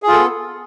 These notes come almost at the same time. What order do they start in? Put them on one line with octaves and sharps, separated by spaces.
G#4 F4 A4 B3